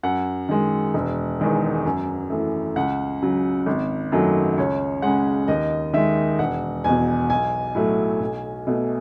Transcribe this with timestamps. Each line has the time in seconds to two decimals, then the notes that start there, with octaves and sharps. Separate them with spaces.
0.03 F#2 F#5
0.49 D#3 G#3
0.94 E1
1.39 E2 D#3 G#3
1.86 F#2
2.30 E3 A3
2.76 C#2 F#5
3.22 C#3 F#3
3.66 G#1
4.12 F#2 D#3 F#3 A3
4.57 C#2 C#5
5.02 C#3 G#3 F#5
5.48 D#2 D#5
5.93 D#3 G#3 E5
6.39 E1 F#5
6.84 E2 B2 G#5
7.30 B1 G#5
7.75 A2 F#3 A3
8.20 B1
8.67 B2 A3